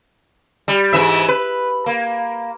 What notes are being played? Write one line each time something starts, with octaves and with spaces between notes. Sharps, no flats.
G3
G#2 E3 E5
B4
A#3